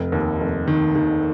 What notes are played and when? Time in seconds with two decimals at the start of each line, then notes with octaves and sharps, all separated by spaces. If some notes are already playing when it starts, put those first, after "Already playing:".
Already playing: F1
0.12 D#2
0.40 F1
0.68 D#3
0.96 D#3